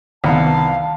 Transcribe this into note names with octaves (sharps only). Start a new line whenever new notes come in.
C2 D#3 B3 F5 A5